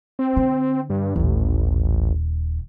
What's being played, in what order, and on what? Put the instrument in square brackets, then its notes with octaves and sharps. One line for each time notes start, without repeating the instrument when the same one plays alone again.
[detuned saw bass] C4
[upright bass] D3
[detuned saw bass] G2
[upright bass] D#1 D#2 [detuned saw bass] A1